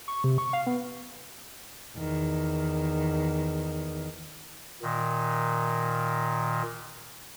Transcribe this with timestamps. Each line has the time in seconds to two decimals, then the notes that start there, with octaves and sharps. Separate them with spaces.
0.08 C#6
0.24 C3
0.38 C#6
0.53 F5
0.67 B3
1.97 E2 D#3
4.82 A#2 D#3